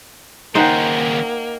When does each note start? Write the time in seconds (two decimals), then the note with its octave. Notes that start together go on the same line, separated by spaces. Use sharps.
0.55 D#2 C#3 A#3 D#4 C5 D#5 F#5 G5